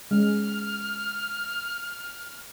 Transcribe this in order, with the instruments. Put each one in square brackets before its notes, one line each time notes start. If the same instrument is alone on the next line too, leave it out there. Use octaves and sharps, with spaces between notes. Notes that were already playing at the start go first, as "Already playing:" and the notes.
[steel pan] G#3 C#4 [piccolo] F6